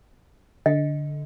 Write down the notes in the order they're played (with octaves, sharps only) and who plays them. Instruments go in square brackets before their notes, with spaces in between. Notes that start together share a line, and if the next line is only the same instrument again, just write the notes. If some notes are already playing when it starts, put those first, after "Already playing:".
[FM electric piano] D3 [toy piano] D#5